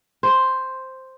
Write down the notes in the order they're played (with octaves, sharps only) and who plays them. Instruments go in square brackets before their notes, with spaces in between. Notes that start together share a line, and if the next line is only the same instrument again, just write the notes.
[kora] C5